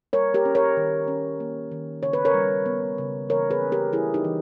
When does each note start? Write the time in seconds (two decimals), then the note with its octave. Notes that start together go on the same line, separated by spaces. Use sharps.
0.13 G3 A#4 C#5
0.34 G4 A#4
0.45 C#4
0.55 A#4 C#5
0.77 D#3
1.08 C#4
1.40 A#3
1.72 D#3
2.03 C#3 C#5
2.13 B4
2.25 A#4 C#5
2.34 G3
2.66 B3
2.98 C#3
3.29 E3 A#4 C#5
3.51 G#4 B4
3.61 C#4
3.72 G4 A#4
3.93 G3 E4 G#4
4.14 D#4 G4
4.24 E3